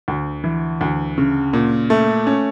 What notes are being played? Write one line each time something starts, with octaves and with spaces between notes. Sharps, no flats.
D2
E3
D2
C#3
A#2
A3
C#4